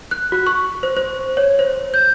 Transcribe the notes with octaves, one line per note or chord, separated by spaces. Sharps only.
F#6
F#4
C#6
C5
C5
C#5
C5
G6